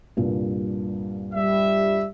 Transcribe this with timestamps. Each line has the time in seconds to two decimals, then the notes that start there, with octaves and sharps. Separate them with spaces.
0.17 C2 G2 A#2
1.34 G3 E5